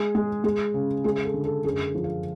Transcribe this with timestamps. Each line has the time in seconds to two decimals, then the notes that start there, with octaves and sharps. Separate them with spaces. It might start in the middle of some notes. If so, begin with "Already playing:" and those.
Already playing: G#3 G#4
0.15 G#3
0.44 G#3 G#4
0.74 C#3
1.04 G#3 G#4
1.24 A4
1.34 D3
1.45 A4
1.64 F#2 G#4
1.95 F3
2.04 F4